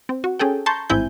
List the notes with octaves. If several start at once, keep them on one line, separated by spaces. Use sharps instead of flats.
C4
F#4
C#4 G#4 A4 G5
A5 A#5 C6 C#6 G6
A1 G#2 C4 E4 G#5 G6